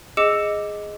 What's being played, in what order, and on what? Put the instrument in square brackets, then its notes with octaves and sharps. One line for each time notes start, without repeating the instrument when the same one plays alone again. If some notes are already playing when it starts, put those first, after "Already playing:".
[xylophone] G#4 D#5 D6 E6 C#7 E7